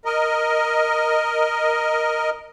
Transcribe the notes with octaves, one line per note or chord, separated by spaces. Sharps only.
A#4 D#5